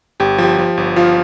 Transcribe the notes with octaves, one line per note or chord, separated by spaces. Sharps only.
G1 G4
F3 G4
F3
G1
F3 F4